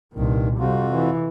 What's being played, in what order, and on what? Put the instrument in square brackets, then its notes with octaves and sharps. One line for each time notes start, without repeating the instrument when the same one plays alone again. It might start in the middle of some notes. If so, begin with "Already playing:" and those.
[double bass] C2 A#2 [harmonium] G2 D#3
[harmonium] F2 F4 F#4 [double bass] C3 G3
[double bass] E3